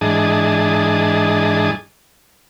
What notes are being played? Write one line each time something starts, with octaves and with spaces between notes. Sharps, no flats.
G#2 E3 D4 G#4 D#5 A5